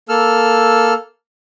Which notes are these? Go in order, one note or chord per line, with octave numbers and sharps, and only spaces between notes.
A#3 A4 E6 F6